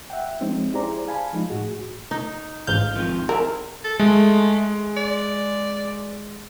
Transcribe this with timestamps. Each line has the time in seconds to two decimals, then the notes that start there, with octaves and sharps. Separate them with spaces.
0.10 E5 F#5 G5
0.41 F3 G#3 C4 C#4 D#4
0.74 E4 G4 G#4 C5 D5 A#5
1.08 F5 G#5 A5 B5
1.33 F3 G#3 D#4
1.50 A2 F#4 G#4
2.11 D#4
2.67 A1 G#2 F5 G6
2.95 F2 D#3 F4
3.29 C4 E4 A#4
3.84 A4
3.99 G#3 A3
4.97 D5